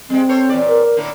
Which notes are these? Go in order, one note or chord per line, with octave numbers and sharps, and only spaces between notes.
G3 G#3 C4
A4 C5 C#5
E2 A#2 D5
A#4
A2 D3 A#3